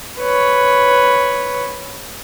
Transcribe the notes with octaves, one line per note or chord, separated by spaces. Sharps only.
B4 C#5